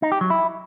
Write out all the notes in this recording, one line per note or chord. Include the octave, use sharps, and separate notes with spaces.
D#4
G4
F#3
E4